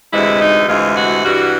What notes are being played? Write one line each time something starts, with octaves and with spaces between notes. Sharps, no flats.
D2 C3 E3 G#3 E4
D#4
D2 C3 E3 G#3 F4
F#4
G2 E3 G3 F#4